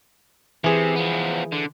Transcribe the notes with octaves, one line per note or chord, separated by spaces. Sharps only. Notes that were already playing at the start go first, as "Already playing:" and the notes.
C3 E3 G#4
F3 B3
D3